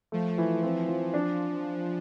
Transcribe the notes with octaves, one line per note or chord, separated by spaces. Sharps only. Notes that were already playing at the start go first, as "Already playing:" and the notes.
F3 A3
E3
C4
F3
D4